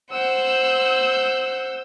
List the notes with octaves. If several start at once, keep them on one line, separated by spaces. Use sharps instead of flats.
C5 F#5 E6 G6